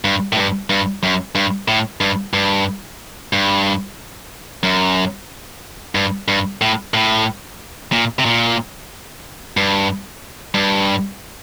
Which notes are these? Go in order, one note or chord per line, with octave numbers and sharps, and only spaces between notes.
G2
A2
G2
G2
F#2
G2
A2
G2
G2
G2
F#2
G2
G2
A2
A2
A#2
C3
A#2
G2
G2